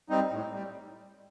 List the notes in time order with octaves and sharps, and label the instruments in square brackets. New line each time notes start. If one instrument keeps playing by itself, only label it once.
[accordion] G3 C4 D#4
A2
G3